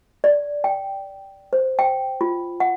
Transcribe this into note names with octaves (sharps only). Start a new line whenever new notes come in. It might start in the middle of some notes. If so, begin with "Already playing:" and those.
D5
G5
C5
G5
F4
F#5